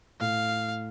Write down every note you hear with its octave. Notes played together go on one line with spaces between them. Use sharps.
A2 F5